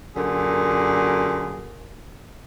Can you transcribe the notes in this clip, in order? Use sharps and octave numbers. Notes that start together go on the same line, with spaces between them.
F#2 A#2 D3 G#4